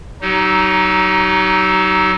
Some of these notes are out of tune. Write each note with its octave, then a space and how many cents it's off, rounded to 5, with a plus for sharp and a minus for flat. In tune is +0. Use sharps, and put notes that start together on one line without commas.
F#3 +25 D#4 +0 G4 -45